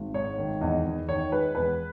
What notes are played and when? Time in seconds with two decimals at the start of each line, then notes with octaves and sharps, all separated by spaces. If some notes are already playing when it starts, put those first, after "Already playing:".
Already playing: G#1
0.14 G#2 C#5
0.38 D#3
0.61 E2 D#5
0.85 E2
1.08 D#3 C#5
1.32 G#3 B4
1.55 E2 B4